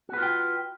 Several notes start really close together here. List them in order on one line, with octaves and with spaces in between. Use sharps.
F#4 B4 F4 G5